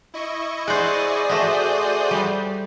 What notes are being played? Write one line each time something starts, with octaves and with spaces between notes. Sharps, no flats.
E4 D#5 C#6
G#4 C5 D5 F#5 D#6
A3 F#4 C5 D#5 G6
G3